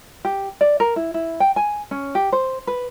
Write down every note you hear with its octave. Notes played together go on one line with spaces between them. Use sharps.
G4
D5
A#4
E4
E4
G5
G#5
C#4
G4
C5
B4